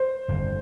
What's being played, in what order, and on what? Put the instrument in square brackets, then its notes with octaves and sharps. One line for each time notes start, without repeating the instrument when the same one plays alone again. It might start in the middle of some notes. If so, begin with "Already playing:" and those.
Already playing: [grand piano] C5
[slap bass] G1 F2 D3 G3